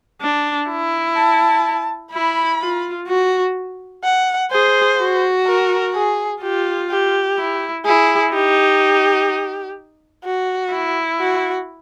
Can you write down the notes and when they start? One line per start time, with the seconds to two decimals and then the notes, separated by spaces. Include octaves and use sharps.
0.22 D4
0.70 E4
1.17 A5
2.13 E4 B5
2.61 F4
3.08 F#4
4.04 F#5
4.51 G#4 C5
4.99 F#4
5.47 A#4
5.95 G#4
6.42 F4 G4
6.91 G4
7.38 E4
7.85 E4 G#4
8.33 D#4 G4
10.25 F#4
10.72 E4
11.20 F#4